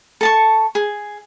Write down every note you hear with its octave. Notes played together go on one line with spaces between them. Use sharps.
A4 A5 C#6
G#4